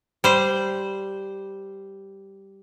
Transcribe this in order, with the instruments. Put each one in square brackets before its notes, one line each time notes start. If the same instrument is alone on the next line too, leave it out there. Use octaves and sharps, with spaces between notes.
[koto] G3 C5